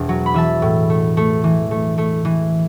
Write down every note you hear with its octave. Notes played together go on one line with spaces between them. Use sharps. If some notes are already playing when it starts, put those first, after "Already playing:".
Already playing: E1 B2
F#3
B5
E3 E5 A5
A2
A3
A3
E3
A3
A3
E3